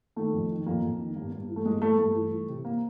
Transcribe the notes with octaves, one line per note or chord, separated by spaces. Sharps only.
D#3 A3
F2
D#3
F2 A#3
F2
D#3
G2
G2
E3
A3
G2 G#3
E3 A3
G2 A3
E3
E3
C3
A#3